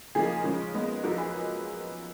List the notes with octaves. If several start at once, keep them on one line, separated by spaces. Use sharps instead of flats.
C#3 F3 A#3 D#4 G#4
C#3 F3 G#3 C#4
A#2 G#3 B3 D#4
F#2 F3 A#3 D#4 F#4 A#4
G#4 B4